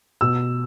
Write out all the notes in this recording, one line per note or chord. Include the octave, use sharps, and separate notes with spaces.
B2 E6